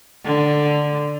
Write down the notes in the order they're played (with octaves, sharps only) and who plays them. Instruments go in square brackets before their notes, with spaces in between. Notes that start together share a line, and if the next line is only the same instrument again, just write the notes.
[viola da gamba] D3